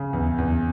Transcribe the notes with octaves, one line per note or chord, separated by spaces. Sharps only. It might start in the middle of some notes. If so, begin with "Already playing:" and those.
Already playing: C#3
E2
E2